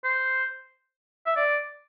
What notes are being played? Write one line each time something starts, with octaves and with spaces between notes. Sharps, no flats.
C5
E5
D5